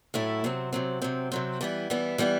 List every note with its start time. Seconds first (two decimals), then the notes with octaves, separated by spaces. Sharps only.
0.14 A2 F#3 A3 E4
0.44 C3 F#3 C4
0.73 C3 F#3 C4
1.02 C3 F#3 C4
1.32 C3 F#3 C4
1.61 E3 G3 B3 E4
1.90 E3 G3 B3 E4
2.18 E3 G3 B3 E4